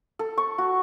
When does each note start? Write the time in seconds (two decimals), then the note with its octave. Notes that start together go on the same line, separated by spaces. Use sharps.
0.19 A4
0.38 C#6
0.58 F#4